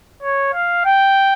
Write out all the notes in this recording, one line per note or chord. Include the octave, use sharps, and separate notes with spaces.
C#5
F5
G5